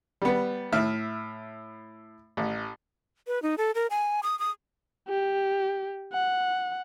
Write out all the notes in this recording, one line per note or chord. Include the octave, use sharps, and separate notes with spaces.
G3 B3
A2 E5 F6
A1
B4
D#4
A4
A#4
G#5
D#6
D#6
G4
F#5